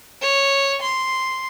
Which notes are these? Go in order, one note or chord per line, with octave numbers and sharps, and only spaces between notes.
C#5
C6